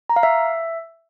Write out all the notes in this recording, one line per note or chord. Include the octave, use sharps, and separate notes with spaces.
A#5
F5
E5